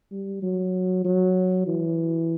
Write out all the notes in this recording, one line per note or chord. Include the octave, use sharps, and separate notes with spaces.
G3
F#3
F#3
E3